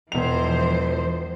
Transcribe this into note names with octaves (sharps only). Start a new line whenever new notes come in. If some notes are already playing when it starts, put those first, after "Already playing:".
E1 E3 F3 C5 F7